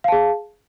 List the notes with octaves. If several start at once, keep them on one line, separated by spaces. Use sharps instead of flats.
G#4 F5 A5